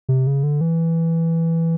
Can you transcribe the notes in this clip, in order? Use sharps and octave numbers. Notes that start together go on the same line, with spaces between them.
C3
C#3
D3
E3